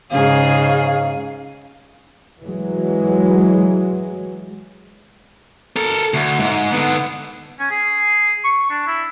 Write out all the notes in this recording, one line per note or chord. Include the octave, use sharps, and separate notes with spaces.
G#2 C#3 G#4 F5
E3 F#3 G#3
A4 A#4
D2
G#2
D3 B3
C#4
G#4
C#6
D4
E4